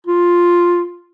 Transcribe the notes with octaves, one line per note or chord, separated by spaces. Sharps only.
F4